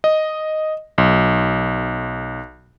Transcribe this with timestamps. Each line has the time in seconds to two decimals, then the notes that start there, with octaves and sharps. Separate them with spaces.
0.04 D#5
0.98 B1